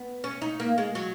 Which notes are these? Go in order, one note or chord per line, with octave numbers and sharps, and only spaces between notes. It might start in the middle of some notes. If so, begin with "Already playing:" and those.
Already playing: B3
C#4
D#4
A#3
G#3
F#3